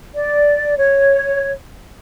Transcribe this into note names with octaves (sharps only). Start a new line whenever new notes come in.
D5
C#5